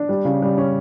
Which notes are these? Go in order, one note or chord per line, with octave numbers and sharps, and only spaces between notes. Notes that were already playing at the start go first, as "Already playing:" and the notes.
Already playing: D4
G3
C#3
G3
C#4